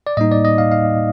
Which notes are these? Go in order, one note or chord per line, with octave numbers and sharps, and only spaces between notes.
D5
A2 G3 A#3 D#4 D#5
D5
D#5
F5
F5